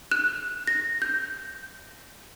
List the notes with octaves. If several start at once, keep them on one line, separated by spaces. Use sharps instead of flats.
F#6
A#6
G6